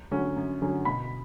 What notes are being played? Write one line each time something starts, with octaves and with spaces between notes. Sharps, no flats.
D3 F#3 C#4
F#2
D3 F#3 C#4
B2 B5